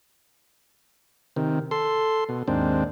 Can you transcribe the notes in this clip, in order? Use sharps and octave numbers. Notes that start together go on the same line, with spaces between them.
C3 D#3
A4 C6
B2
D#2 G#2 C4 D4